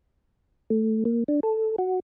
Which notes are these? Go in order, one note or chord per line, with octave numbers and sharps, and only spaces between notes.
A3
A#3
D4
A4
F#4